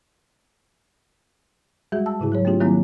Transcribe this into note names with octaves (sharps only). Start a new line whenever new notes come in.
G3 G#3 F#4 G#4 E5
A5 E6
G#2 C#3 E4 G#4
F#3 G#4 C#5
A3 B3 D4 F4 G4 G#4
D#3 F#3 G3 A#3 C4 E4